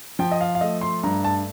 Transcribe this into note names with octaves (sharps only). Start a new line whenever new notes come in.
F3 G5
D#5
F5
F5
A3 D#5
C6
G2 A#5
A5